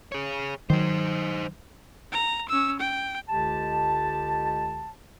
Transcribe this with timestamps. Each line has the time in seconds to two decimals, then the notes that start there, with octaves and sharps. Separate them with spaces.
0.12 G#4 C#5
0.70 D#3 F#3 D#4 C5
2.12 A#5
2.48 C#4 E6
2.79 G5
3.29 C#2 D3 G#3 G4 A5